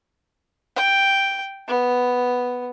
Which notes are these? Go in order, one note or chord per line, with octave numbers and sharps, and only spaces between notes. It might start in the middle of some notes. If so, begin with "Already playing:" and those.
G5
B3